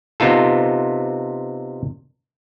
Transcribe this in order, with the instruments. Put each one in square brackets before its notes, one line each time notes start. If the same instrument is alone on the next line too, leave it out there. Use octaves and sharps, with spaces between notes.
[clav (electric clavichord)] C3 B3 D#4 F4 A4